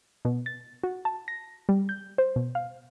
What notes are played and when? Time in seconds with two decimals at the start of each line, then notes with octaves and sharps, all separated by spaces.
0.25 B2
0.46 A6
0.83 F#4
1.05 A5
1.28 A#6
1.69 G3
1.89 G6
2.18 C5
2.36 B2
2.55 F5